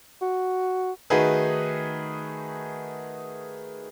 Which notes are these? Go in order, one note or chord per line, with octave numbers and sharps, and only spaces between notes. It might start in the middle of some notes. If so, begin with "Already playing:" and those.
F#4
D#3 A3 D#4 F#4 G#4 B4